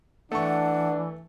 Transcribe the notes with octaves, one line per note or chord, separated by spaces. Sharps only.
E3 A3 D4 F#5 C#6